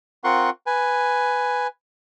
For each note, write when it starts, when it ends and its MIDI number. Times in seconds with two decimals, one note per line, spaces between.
0.24 0.50 60
0.24 0.50 65
0.24 0.50 70
0.24 0.50 78
0.24 0.50 84
0.24 0.50 85
0.66 1.67 71
0.66 1.67 80